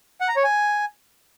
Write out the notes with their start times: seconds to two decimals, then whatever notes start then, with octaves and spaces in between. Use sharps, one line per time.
0.21 F#5
0.29 A#5
0.36 C#5
0.44 G#5